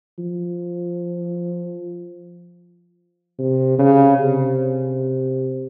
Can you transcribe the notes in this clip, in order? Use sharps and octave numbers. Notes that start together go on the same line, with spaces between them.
F3
C3
C#3
C3